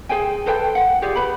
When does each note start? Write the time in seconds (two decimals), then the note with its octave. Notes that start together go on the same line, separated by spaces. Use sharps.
0.09 G#4 C5 G5 G#5
0.46 A4 B4 C5 G5
0.75 F#5
1.02 F4 G4 G#4 D5
1.16 B4 B5